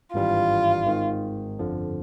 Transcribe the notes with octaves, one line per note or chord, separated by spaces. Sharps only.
G#1 G2 E3 G3 F4
G#1 G#2 D#3
G1 F2 D3 F3